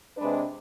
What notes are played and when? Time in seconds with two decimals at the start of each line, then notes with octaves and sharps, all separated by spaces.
0.17 C3 G#3 D4 B4